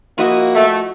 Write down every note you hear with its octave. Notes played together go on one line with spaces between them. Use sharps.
F3 A#3 E4 F#4 D#5
A3